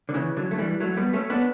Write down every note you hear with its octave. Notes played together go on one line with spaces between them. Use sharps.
D3
C#3 E3
D3 F#3
A3
E3 G3
F#3 A3
G3 B3
A3 C#4
B3 D4